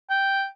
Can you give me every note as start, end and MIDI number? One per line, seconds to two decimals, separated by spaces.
0.10 0.46 79